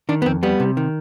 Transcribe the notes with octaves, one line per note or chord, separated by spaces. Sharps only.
D#3 D4
B3
F2 C4
G3 B3
C3
D#3